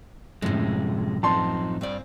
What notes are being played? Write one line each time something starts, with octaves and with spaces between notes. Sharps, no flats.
F#2 A2 C3 F3 G#3
F3 C4 D#4 A5 C6
G2 A#2 C4 D5